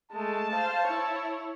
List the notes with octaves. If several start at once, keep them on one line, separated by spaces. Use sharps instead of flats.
G#3 A3 A5
C5 F5
E4 C#5